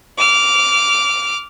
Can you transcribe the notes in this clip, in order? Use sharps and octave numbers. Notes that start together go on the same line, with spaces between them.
D6 F6